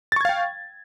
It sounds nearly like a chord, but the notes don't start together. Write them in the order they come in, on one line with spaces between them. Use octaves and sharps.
A6 C#6 G#6 F5 G5